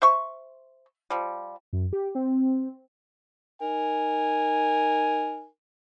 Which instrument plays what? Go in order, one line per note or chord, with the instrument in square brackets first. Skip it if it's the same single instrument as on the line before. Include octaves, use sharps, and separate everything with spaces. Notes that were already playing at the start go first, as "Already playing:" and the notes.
[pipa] C5 E5 C#6
F3 G3
[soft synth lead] F#2
G4
C4
[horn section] D#4 A#4 G#5